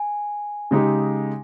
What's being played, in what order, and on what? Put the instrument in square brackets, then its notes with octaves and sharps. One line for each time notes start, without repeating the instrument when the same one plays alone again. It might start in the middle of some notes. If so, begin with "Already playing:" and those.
Already playing: [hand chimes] G#5
[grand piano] C#3 G#3 D#4 G4